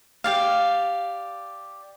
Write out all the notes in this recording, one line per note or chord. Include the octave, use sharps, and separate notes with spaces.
G4 D5 F5